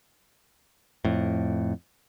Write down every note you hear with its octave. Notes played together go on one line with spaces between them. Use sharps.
F2 A2